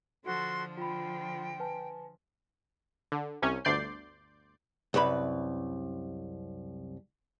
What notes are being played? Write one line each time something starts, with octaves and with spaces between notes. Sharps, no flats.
D3 F3 F#4 A4 C6
F4 G5 B5
B4 G#5 A5
D3
C2 C3 C#4 G#5
G1 D2 D5 C6 G6 C7
C2 F#2 B4 B5